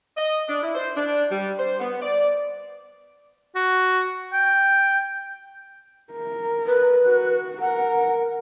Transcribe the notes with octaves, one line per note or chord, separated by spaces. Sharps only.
D#5
D4
E4
C5
D4
G3
C5
B3
D5
F#4
G5
A#4
B4
F#4
A#4 F#5